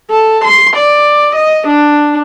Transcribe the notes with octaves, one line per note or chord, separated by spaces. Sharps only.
A4
C6
D5
D#5
D4